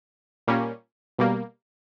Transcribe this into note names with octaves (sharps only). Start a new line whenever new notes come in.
A#2 G3 A#3 C#4
B2 G3 A#3